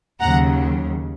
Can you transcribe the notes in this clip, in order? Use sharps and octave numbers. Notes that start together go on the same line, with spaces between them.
D#2 C#3 F#3 F#5 A#5